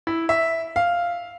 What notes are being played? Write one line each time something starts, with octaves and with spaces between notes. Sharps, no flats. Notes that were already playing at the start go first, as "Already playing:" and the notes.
E4
E5
F5